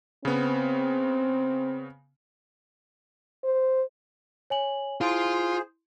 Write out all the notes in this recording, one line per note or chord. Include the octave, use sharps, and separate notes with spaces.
C#3 B3 C4
C5
C#5 G#5 F#7
E4 F4 G#4 C5 C6 D7